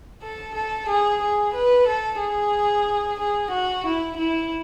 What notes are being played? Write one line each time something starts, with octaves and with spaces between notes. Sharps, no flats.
A4
A4
G#4
G#4
B4
A4
G#4
G#4
F#4
E4
E4